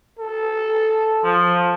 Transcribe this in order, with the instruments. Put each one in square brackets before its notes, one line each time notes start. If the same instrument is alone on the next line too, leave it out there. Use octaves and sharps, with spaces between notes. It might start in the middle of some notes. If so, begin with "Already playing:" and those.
[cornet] A4
[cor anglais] F3